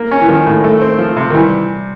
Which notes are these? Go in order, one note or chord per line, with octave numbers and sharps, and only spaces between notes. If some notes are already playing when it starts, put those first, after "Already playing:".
Already playing: A#3
C#4
E3
D#3 F3
A2
A3
C4
F3
C3
D#3
E3 G3